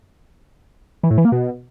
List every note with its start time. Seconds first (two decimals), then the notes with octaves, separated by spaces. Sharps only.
1.03 E3
1.11 A2
1.18 E3
1.25 A#3
1.32 B2